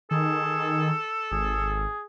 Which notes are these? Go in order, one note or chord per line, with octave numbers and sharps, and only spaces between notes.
D#3 G#4 A4
G#1 G#4